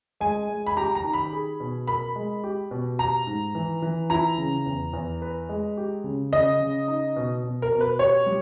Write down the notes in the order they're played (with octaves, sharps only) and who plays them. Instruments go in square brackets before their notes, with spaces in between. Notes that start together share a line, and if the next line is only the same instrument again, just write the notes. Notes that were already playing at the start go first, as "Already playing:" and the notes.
[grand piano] G#3 [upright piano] G#5
[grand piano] G#3
[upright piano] B5
[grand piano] G4 [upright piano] A#5
[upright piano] A#5
[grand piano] D#3
[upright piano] B5
[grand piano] G#4
B2
[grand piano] A#4 [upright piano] B5
[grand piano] G#3
G4
B2
[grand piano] G4 [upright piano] A#5
[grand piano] G#2
E3
E3
[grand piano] E4 [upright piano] A#5
[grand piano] C#3
E2
E2
B4
G#3
G4
C#3
[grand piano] C#3 [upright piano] D#5
[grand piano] C#3
D#4
B2
B2
[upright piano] A#4
[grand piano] B2
[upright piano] B4
[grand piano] G4 [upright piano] C#5
[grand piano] G3